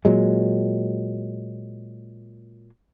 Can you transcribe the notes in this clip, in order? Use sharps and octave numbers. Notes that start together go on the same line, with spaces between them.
A#2 F#3 G#3